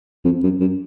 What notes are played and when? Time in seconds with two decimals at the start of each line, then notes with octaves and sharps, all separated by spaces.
0.24 F2
0.43 F#2
0.60 F#2